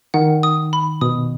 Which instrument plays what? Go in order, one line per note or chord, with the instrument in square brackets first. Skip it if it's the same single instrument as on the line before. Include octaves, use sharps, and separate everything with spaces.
[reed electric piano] D#3 [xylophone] F#5
[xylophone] D#6
B5
[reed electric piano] B2 [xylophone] D#6